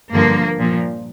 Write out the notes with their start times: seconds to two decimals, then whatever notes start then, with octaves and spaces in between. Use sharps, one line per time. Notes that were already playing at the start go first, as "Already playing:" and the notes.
0.12 G2 D3 F3 A#3
0.58 A#2 F3